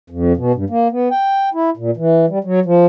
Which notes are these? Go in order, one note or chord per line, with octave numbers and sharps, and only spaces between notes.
F2
B2
G2
A#3
B3
G5
E4
A#2
E3
G3
F#3
F3